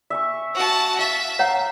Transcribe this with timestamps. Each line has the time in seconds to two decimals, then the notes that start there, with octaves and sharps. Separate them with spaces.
0.10 E5 G#5 C#6
0.54 F#4 A5
0.99 E5 F5
1.39 C#5 F5 F#5 A#5